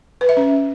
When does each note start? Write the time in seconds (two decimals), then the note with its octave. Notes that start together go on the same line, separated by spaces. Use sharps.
0.21 B4
0.29 E5
0.37 C#4